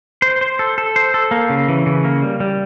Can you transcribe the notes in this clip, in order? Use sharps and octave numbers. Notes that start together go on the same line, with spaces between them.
C5
C5
A4
A4
C5
A4
A#3
C#3
E3
C#3
A#3
G3
G3